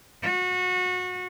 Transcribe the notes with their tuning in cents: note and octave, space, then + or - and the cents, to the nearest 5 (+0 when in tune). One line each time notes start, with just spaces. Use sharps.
F#4 -25